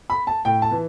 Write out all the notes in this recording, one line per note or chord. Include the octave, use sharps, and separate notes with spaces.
B5
A5
A2 G5
A5
E3